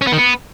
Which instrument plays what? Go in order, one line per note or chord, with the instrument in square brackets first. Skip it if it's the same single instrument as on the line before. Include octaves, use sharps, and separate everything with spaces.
[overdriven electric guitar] C#4
B3
D#3
B3